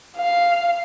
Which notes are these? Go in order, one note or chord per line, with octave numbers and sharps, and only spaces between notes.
F5